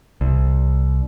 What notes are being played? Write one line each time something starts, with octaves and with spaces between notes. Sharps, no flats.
C2